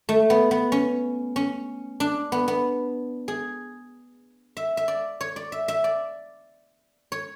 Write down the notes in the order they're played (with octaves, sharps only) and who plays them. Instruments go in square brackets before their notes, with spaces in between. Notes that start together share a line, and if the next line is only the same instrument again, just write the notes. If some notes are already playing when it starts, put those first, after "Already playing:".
[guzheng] A3
B3
B3
C#4
C#4
D4
B3
B3
G#4
E5
E5
D5
C#5
D5
E5
E5
D5
C#5